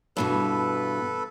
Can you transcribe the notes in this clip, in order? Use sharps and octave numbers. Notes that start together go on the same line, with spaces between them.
G2 B2 E3 A4 B4